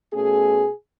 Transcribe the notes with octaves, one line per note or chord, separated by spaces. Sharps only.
B2 A3 C#4 G#4